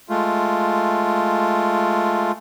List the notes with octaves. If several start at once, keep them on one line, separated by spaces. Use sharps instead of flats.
G#3 A3 F4